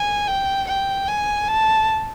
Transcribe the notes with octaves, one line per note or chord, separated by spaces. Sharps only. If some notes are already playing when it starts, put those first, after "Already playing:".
Already playing: G#5
G5
G5
G#5
A5